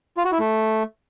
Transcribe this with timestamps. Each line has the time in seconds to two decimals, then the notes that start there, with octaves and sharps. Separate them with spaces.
0.17 F4
0.25 F#4
0.32 E4
0.39 A3